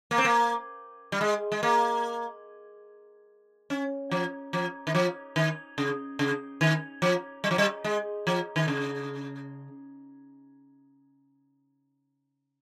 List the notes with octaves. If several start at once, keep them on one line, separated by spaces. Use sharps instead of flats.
A#3
C4
A#3
G3
G#3
G#3
A#3
C#4
F3
F3
D#3
F3
D#3
C#3
C#3
D#3
F3
G3
F3
G3
G#3
F3
D#3
C#3